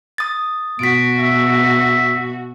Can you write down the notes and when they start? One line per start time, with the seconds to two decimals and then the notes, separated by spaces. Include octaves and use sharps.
0.18 D#6 A6
0.79 B2 F#4 B6 D7
1.19 E5